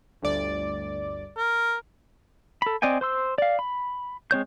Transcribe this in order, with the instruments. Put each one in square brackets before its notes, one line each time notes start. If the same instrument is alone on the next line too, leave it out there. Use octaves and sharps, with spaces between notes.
[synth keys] G1 D2 D5
[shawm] A#4
[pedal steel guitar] A4 B5
C4 D5 D#5 G5 G#5
C5 C6 E6
D5 F5
B5
G#3 C4 C#5 G6